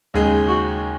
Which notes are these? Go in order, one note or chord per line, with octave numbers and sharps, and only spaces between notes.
D#2 C#3 G#3 D#4 G#4
F#4